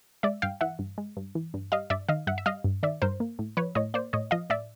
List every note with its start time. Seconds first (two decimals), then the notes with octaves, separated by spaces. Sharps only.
0.23 G#3 D5 E5
0.42 G2 F5 G5
0.61 E3 E5 F#5
0.79 G2
0.98 G#3
1.17 G2
1.35 E3
1.54 G2
1.72 G3 D#5 F5
1.90 G2 D5 E5
2.09 D#3 D#5 F5
2.27 G2 E5 F#5
2.38 E5
2.46 G3 D#5 F5
2.64 G2
2.83 D#3 D5 E5
3.02 G2 A#4 C5
3.20 A#3
3.39 A2
3.57 F3 B4 C#5
3.75 A2 C#5 D#5
3.94 A#3 C5 D5
4.13 A2 C#5 D#5
4.31 F3 D#5 F5
4.50 A2 D5 E5